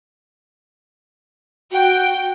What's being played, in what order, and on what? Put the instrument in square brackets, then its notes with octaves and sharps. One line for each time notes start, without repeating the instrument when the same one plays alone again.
[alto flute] F#4 [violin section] G5